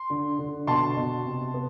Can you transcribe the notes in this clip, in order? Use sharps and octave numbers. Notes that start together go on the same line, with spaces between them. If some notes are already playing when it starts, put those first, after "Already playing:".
Already playing: C6
D3
D3
B2 A5 C6
B2
C3
B3